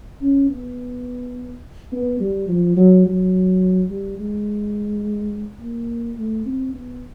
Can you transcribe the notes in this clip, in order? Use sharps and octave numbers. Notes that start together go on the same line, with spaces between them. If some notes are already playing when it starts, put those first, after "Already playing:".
C#4
B3
B3
G3
F3
F#3
F#3
G3
G#3
A#3
A3
C4
B3